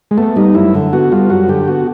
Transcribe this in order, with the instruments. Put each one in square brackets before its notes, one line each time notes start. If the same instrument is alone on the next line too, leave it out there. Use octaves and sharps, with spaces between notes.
[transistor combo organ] G#3
[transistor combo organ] A3 [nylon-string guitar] B3
[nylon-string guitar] G3 [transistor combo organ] D#4
[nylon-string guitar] F#2 [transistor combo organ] E4
[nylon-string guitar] D3
[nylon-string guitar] B3 [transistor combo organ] F#4
[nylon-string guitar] G3 [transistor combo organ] F4
[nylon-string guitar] F#2 [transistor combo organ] F#4
[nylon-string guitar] D3 [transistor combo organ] G4
[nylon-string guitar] B3 [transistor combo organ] F#4